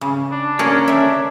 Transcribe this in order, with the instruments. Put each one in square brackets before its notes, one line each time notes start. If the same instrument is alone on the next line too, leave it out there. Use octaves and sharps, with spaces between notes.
[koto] C#3
[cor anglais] D4
[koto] A#3 G#4 C#5 [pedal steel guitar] C#4 A#4 [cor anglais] D4
[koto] A3 E5